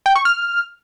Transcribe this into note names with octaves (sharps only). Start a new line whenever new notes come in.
G5
C#6
F6